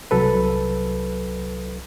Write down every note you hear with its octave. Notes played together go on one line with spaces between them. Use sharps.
C2 F#3 A4 B4